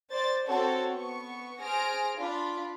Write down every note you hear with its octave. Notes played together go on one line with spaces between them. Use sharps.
C5 D5 A6
C4 F#4 A4 C5 C#5
B3 C#6
G#4 C5 G#5 F6 A#6 D7
D4 F4 B5